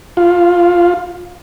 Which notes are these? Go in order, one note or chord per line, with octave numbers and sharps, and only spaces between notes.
F4